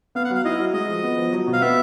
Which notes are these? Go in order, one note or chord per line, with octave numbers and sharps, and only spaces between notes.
B3 F5
F#5
F#3
F5
E4 D#5
F#3
G#3 D#5
F3
B3
F3
F#3
B2
F5
B3 E5